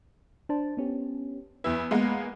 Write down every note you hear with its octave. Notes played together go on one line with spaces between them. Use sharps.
D4 C5 A5
B3 C#4 G4
E2 E4 B4
G#3 A#3 B3